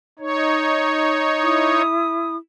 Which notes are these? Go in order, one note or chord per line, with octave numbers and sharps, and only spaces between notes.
D#4 C#5
E4 D#6